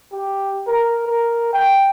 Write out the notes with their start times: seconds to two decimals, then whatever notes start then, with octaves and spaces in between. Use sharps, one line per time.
0.12 G4
0.67 A#4
1.07 A#4
1.53 G5